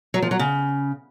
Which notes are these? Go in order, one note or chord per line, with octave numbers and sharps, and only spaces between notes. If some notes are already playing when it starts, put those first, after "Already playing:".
F#3
F3
F#3
C#3